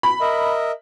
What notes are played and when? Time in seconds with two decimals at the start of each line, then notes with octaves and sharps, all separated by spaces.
0.03 B5
0.20 A#4 D#5 E5